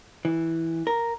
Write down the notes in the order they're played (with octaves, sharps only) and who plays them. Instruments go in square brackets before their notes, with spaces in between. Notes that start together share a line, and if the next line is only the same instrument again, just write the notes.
[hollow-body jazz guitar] E3
A#4